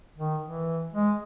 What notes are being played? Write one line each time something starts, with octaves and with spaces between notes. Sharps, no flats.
D#3
E3
G#3